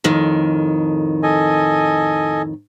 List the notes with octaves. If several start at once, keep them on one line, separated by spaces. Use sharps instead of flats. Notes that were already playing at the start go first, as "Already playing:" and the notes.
F2 A2 D#3
A4 D#5 G#5